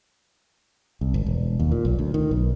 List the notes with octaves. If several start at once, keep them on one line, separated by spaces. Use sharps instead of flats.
C2
G#1
E1
D#2
A#2
B1
D2
D#3
B1